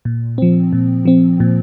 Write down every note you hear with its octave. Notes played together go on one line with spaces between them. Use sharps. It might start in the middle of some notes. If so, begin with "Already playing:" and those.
A#2
F3 C4
A#2
F3 C4
A#2